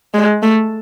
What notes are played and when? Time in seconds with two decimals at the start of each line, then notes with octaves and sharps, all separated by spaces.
0.14 G#3
0.42 A3